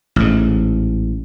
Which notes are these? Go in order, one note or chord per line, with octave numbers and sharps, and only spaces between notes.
A1 G#2